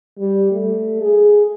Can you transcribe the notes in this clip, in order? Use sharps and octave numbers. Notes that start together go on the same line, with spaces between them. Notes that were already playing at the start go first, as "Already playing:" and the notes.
G3
A3
G#4